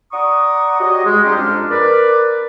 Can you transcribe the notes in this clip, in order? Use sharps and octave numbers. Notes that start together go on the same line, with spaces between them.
D5 F#5 A#5 C#6 D#6
F#4 G4 C#5 D#5
G#3
G3 G#3 C#4 D#4 F4 G4
F2 D4 F6
A#4 B4 D5